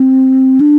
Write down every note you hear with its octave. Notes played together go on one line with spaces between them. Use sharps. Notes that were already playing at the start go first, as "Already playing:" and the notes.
Already playing: C4
D4